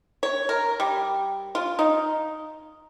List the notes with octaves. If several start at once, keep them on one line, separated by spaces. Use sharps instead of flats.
C#5
A#4
G3
F4
D#4